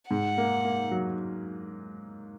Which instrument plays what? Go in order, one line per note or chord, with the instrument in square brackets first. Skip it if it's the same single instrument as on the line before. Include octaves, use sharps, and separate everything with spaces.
[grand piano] G#2 [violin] F#5
[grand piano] A#3
A#3
F#3